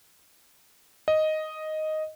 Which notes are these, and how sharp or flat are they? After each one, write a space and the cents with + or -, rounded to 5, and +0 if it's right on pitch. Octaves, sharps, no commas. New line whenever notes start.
D#5 +0